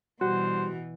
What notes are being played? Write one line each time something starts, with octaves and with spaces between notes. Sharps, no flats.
B2 E3 G3 F#4 G4 C5